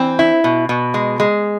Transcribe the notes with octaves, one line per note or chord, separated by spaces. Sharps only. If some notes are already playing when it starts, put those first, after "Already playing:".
Already playing: E3 C4
E4
B2
B2
G#3
G#3